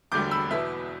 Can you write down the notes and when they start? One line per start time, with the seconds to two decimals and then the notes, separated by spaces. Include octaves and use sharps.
0.12 E1 D2 D3 G3 D6 G6
0.31 B5 E6
0.50 E2 B2 B3 E4 E5